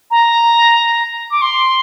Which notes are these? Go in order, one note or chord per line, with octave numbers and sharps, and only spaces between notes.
A#5
D6
C6